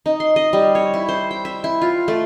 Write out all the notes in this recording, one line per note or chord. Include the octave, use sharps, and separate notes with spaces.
D#4
C6
D#5
G3
C#5
E4
C5
G5
E5
E4
F4
A3